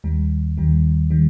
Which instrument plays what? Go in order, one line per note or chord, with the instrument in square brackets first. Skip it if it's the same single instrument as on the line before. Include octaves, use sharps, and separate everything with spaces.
[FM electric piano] D#2 D#3 G3
D#2 D#3 G3
D#3 G3